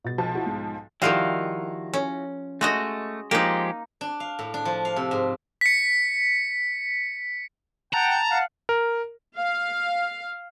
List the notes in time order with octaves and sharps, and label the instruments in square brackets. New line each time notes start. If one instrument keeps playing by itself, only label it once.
[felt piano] B2 A6
[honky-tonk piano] B1 F3 A5
[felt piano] E4 F#4 F#5
G#2
[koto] D#3 F3 G3 [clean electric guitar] E4 F#4 F5
[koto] C#4
[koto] G#3 F#4 D#5 [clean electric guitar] A3
[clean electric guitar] F3 G#3 G4 [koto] A#3 D#4
[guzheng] D4
F5
A2
D4
F3
F5
C3
G#2
[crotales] B6 C#7
[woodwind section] F#5 G5 [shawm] A5 [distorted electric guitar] A#5
[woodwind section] F5 F#5
[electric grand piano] A#4
[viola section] F5